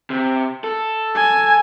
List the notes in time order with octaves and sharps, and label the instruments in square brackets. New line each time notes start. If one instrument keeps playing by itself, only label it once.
[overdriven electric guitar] C3
A4
[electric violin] G#5